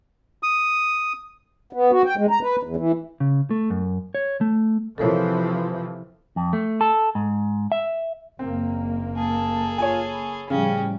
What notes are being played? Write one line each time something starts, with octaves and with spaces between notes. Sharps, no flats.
D#6
B3
F#4
G5
G#3
A#5
B4
E2
E3
C#3
A3
F#2
C#5
A3
C3 E3 F3 A4 A#4 C#5
F2
A3
A4
G#2
E5
F#1 A#3 C4
G#4 A4 A5
F4 C#5 G#5
B5
A2 C#3 F3 G3 C#4 G5